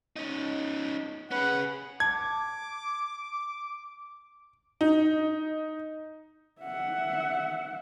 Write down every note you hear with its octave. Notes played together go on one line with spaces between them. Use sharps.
C#4 D#4
C#4 G#4 B4 F#5
A5 D6 G#6
D#4
E5 F#5